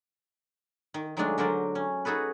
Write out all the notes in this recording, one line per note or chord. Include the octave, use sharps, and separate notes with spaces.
D#3
D#3 F#3 G#3 A3 D4
D3 F#3 A#4 C5 D5
C#4
D#4 F#4 G#4 A4 B4